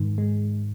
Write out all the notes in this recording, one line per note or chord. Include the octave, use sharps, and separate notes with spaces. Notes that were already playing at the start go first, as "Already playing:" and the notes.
Already playing: G#2 D#3
G#3